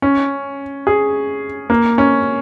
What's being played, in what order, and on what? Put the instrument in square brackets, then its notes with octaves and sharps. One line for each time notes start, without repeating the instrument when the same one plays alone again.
[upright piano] C#4
G#4
A#3
C#4